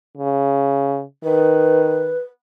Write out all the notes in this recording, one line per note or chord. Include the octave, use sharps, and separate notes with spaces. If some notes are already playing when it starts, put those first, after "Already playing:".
C#3
D#3 B4